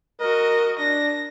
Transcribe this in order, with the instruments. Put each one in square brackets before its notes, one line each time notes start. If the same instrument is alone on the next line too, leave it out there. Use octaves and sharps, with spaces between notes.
[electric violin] F#4 D#5 [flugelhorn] A#4
[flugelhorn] D4 [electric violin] A#6